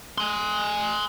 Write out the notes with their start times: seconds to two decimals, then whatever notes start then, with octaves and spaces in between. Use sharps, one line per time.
0.18 G#5 C6